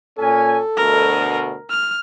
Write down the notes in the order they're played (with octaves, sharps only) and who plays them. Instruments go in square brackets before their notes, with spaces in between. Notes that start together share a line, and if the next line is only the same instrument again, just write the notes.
[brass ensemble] A#2 C#4 G#5 [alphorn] A4
[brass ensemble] D2 B2 [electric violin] A#4
[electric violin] F6